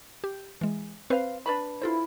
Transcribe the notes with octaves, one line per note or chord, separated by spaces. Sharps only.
G4
E3 G#3
C4 B4 C5 F5
D4 B4 B5
E4 F4 A4 C5